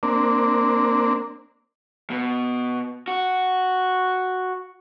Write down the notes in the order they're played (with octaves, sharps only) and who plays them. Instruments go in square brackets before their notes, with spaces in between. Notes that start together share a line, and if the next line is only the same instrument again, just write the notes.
[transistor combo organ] A#3 C4 D4
[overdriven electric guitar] B2
F#4